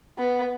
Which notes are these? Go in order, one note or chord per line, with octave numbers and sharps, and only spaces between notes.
B3